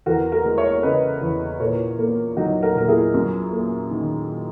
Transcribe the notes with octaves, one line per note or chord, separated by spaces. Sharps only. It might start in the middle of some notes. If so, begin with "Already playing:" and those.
E2 F#4 A#4
F#4 A#4
G#3
C#5 E5
C#5
C#3 B4 D#5
E2
A#2 A#4 C#5
A#3
F#3 D#4 F#4
F#4 A#4
A#2 A#4
E4 G#4
F#2
A#3
D#3